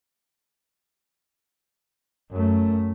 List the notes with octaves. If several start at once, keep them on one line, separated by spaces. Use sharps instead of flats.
F#2 A3